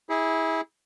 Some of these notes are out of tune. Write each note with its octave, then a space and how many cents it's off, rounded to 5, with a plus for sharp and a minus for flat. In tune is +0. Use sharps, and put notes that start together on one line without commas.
E4 -25 G#4 -15